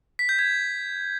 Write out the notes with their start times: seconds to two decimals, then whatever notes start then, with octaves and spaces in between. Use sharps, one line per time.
0.19 B6
0.29 G6
0.39 G#6